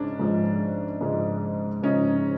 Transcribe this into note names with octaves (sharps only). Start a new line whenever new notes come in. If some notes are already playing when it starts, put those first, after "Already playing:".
Already playing: G#2 G#3 C#4 D4
G#2 F3 G#3
G#2 F3 G#3
G#2 F3 G#3 C#4 D#4